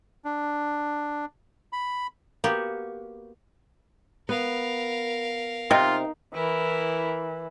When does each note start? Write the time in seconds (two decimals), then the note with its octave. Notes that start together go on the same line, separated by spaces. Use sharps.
0.25 D4
1.73 B5
2.44 A#3 B3 F#4 G4
4.29 B3 A#4 F5
5.71 C3 D#4 F4
6.34 E3 E4 A#4